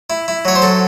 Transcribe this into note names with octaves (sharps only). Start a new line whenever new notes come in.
E4
E4
F#3 C#5
C5
F#3 A4